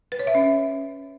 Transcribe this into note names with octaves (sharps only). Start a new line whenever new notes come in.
B4
C#5
E5
C#4